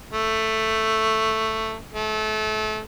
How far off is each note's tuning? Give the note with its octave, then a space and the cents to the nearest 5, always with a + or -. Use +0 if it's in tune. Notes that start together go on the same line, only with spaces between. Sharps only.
A3 +5
A3 -30